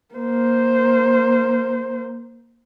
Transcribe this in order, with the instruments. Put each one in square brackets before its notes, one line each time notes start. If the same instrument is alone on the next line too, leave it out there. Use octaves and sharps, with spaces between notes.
[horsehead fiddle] A#3 C5